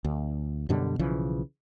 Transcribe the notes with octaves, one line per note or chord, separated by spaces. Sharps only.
D2
F#2 B2 D3 G3
B1 C#3 E3 F3